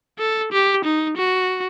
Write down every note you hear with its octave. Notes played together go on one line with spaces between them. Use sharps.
A4
G4
D#4
F#4